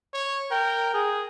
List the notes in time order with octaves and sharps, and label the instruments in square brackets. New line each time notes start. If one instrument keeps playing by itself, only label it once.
[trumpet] C#5
[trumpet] A#4 [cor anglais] G5
[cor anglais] G#4